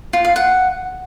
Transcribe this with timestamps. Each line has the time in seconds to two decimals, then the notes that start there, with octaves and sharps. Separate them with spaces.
0.13 F4
0.25 F5
0.36 F#5